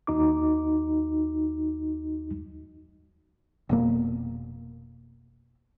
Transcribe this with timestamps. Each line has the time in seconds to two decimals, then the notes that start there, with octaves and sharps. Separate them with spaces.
0.07 D#2 D#4 F#4 D6
3.69 F1 B2 A#3